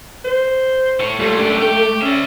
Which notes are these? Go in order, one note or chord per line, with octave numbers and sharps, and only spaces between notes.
C5
A2 C#5
A#2 G3 A3
F#2 D4 G4
G4 G5
C#4 D5 E5